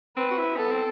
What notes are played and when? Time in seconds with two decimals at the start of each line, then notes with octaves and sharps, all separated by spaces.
0.17 C4 B4
0.31 F#4
0.37 E4
0.57 B3 A4
0.70 C4